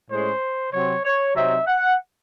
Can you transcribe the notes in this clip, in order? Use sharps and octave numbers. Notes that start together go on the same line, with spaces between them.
A2 G#3 C#4 C5
C3 F#3 C4 C#5
C#5
C3 F#3 C4 D#4 E5
F#5